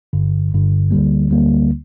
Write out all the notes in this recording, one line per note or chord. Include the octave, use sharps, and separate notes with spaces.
G1 G2 D3
G1 G2 D3
D2 D3 G3 A#3
D2 D3 G3 A#3